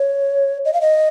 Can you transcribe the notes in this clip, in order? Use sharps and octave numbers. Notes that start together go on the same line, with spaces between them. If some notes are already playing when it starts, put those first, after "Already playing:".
Already playing: C#5
D#5
F5
D#5